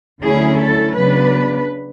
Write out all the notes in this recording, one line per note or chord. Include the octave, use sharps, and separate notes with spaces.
D2 D3 F#3 C#4 E4 G#4
A4
C#3 F#3 B3 D4 B4